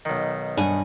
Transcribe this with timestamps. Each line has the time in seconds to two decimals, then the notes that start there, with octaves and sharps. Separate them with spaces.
0.05 B1 D#3
0.57 G2 F#5 G#5